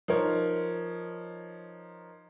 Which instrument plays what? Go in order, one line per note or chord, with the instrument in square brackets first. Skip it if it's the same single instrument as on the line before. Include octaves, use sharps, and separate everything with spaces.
[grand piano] F3 D#4 A#4 C#5